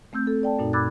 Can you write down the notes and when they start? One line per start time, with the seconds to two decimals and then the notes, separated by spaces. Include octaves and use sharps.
0.13 A3 C4 E6 G6
0.27 A4
0.43 D5 G5 A5
0.59 F#2 A#2 D#4
0.73 B5 D6 E6 F#6 G#6 A6